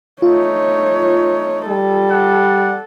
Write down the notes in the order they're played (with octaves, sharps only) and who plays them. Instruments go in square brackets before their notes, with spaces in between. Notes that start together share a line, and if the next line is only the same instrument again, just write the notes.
[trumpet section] A3 D#4 [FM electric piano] F4 [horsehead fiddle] C#5
[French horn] G3 [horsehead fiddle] A4
[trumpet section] D5 F#5